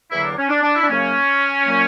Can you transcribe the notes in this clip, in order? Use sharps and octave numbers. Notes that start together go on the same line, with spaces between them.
E2 D3 F#3 A#3 E4
D4
C#4
D4
D4
E4
D4
F#2 C#3 F#3 A#3 C#4
A#2 F#3 A#3